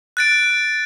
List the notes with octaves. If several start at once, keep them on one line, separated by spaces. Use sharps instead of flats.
F#6 A6 D7